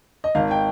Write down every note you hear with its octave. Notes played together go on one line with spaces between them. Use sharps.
D#5
G#1 F5
G5